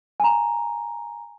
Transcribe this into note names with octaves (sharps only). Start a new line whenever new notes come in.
G#5 A#5